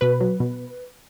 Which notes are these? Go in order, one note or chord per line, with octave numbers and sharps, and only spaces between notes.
B2 B4
F#3
B2